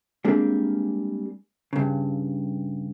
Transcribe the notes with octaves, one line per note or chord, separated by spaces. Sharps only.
G3 G#3 A#3 C4 D4 A#4
G2 C#3